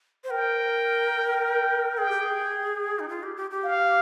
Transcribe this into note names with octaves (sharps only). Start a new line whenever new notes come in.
C5
A#4 G5
G5
G#4 G5
G4
G#4
D#4
F4
G4
G4
G4
F5